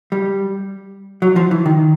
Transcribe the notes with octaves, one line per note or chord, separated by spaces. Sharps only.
G3
F#3
F3
E3
D#3